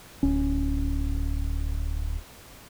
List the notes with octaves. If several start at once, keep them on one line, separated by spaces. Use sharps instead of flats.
D1 C#4